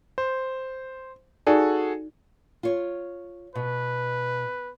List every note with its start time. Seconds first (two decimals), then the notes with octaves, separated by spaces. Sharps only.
0.18 C5
1.47 D#4 F#4 G#4 A4 D5
2.63 F4 C#5
3.55 B2 B4